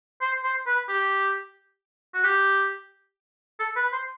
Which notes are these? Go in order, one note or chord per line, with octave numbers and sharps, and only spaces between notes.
C5
C5
B4
G4
F#4
G4
A4
B4
C5